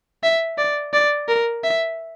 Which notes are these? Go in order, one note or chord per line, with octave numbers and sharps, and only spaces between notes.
E5
D5
D5
A#4
E5